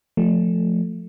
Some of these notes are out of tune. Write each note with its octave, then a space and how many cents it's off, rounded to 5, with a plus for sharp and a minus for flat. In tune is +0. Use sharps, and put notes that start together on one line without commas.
F3 +15 A3 +0